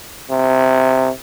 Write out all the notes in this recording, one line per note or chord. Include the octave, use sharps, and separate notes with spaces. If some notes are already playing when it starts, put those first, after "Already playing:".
C3